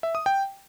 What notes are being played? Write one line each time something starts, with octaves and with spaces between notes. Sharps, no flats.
E5
D#6
G5